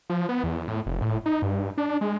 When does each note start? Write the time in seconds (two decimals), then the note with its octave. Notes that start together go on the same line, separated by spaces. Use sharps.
0.10 F3
0.29 B3
0.43 E2
0.68 A2
0.86 F1
1.02 A2
1.26 D#4
1.42 G2
1.78 D4
2.01 G#3